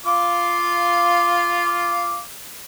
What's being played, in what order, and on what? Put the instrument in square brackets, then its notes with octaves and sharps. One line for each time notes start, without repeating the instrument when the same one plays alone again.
[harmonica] F4 F5 D6